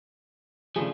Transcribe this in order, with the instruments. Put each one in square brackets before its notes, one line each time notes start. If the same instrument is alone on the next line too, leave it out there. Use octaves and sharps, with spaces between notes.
[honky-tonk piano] C#3 G#4 [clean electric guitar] F3 A3 D4